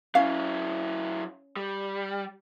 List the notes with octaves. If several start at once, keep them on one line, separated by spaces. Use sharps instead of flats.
F#3 C#4 E4 F5
G3